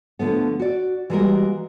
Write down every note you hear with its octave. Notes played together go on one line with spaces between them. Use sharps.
D3 F3 A3 B3
F#4 D5
E3 G3 G#3 A#3 F#4 A#4